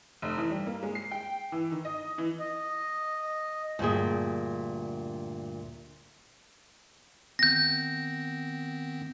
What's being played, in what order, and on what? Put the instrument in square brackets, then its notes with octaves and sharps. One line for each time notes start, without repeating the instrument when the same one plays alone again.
[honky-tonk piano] F1
E3
G3
A#3
G#3
C7
G5
E3
D#3
D#5
E3
[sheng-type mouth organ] D#5
[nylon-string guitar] D2 G2 A#2 G#4
[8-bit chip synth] D#3 B3 C4 [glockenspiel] G6 A#6